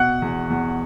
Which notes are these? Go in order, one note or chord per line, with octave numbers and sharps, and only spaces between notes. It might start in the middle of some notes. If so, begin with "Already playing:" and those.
Already playing: B2 F#5 F#6
E2
E2